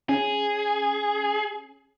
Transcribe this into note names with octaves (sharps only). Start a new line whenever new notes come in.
C#4 G#4